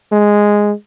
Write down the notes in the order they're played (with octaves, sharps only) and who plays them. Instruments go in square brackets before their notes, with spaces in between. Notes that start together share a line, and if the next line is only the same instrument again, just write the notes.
[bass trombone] G#3